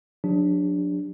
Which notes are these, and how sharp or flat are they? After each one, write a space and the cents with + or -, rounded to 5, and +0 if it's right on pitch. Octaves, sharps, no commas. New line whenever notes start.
F#3 -40 D4 +0 G4 +30